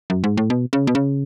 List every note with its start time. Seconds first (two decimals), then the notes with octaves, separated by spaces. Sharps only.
0.10 F#2
0.24 G#2
0.37 A2
0.50 B2
0.73 C#3
0.87 B2
0.95 C#3